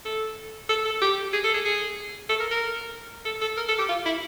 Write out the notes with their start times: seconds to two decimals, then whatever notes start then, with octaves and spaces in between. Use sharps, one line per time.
0.05 A4
0.69 A4
0.85 A4
1.01 G4
1.33 G#4
1.44 A4
1.54 G#4
1.65 G#4
2.29 A4
2.40 A#4
2.51 A#4
3.25 A4
3.41 A4
3.57 A#4
3.68 A4
3.78 G4
3.89 F4
4.05 E4